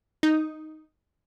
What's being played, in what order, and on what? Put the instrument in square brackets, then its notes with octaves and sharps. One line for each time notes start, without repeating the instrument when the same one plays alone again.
[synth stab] D#4